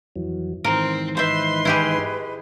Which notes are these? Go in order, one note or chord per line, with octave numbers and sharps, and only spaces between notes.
F2 E3 F#3
G#2 D#3 E3 C4 A#4
B4 C5 D#5 E5 B5 C6
E4 G4 G#4